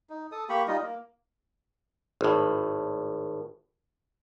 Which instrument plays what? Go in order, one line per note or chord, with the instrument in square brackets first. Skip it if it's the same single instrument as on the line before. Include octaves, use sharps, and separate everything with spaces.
[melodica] D#4
A4 D#6
A#3 G4 B5 C#6
G3 D#4 F4 D#5
A#3
[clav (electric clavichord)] G#1 A2